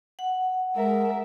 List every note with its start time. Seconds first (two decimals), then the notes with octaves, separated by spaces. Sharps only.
0.19 F#5
0.76 G#3 A#4 E5